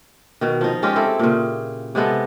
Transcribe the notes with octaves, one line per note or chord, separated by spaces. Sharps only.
B2 D#3
F3 D#4
G#3 C#4 F4 G4
C4 E4 A4
A#2 C#3
C3 G#3 B3 A4